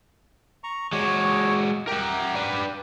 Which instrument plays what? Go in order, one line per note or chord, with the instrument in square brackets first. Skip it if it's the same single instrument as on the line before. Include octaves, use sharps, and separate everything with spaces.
[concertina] A#5 C#6
[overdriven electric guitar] G#3 F#4 [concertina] C#5 D6
[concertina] G4 [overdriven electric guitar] A#4 F#5
[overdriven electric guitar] D4 B4